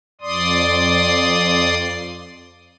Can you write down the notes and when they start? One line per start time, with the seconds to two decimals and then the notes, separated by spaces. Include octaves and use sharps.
0.21 F2 D5 C6 D#6